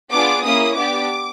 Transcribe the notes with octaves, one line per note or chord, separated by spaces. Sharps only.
B3 D4 F4 G#4 D6
A#3 C#4 E4 D#6
B3 D4 G4 D6